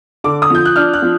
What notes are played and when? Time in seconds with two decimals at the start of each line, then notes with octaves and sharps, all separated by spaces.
0.24 D3 D6
0.42 D#6
0.50 F3 G6
0.65 F#6
0.76 D4 F6
0.94 F#6
1.02 F3